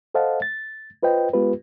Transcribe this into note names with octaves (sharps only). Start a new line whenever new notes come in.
A4 C5 D#5 F5 F#5 A5
A6
F4 B4 C5 D#5 G5
G#3 B3 F4 G4 B4